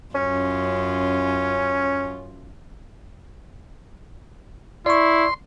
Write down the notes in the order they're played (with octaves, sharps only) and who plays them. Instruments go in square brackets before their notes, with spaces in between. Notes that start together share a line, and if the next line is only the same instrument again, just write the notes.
[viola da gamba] F#2 F4 [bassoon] C#4
[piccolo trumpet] E4 [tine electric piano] D5 C#6 [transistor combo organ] C6